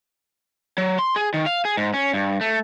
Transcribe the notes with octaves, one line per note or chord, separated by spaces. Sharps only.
F#3
C6
G#4
D#3
F5
G#4
G#2
C#4
G2
A3